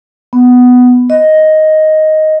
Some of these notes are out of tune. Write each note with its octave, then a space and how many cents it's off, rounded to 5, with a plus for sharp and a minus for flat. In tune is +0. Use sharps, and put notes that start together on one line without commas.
B3 +10
D#5 +5